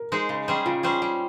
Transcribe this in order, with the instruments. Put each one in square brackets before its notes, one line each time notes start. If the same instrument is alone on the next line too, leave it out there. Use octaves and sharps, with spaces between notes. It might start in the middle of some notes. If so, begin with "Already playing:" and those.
Already playing: [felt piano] A#4
[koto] G#3 D#4 G#4 C5
C#3
G3 C#4 G#4 C5
[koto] C#3 [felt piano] F4
[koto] G3 C#4 G#4 C5
G3